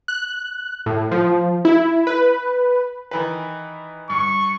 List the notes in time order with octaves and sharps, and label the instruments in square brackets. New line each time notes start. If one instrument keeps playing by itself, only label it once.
[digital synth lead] F#6
A2
F3
E4
B4
[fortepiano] D#3 E3 B4
[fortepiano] G2 [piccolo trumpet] C#6